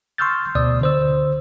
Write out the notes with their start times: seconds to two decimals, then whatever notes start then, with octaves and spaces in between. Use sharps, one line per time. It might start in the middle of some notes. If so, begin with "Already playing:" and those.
0.18 C6 C#6 E6 F6 G6 A6
0.55 D2 B2 D5 D#6 E6
0.81 D3 C5 E6